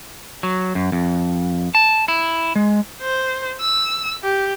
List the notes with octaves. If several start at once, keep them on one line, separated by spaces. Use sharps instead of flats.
F#3
F#2
F2
A5
E4
G#3
C5
E6
G4